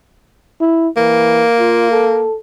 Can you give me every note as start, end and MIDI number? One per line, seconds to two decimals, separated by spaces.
0.61 0.88 64
0.97 1.45 52
0.97 2.26 58
1.59 1.91 65
1.91 2.37 69